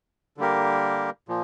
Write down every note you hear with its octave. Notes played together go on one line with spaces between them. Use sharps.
D3 G3 A#3 G4 A#4
A#2 F3